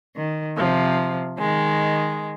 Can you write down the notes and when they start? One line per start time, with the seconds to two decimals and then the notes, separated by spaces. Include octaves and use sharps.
0.16 D#3
0.57 C3 F3
1.39 D#3 G#3